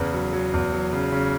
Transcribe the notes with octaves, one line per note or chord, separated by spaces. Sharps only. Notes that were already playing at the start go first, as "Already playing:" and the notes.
Already playing: E2 C#3 B4
F#3
F#3
E2
F#3
C#3
C#3